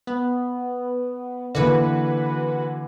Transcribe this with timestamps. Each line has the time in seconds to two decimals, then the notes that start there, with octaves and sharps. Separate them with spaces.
0.07 B3
1.55 D3 E3 A#3 F#4 B4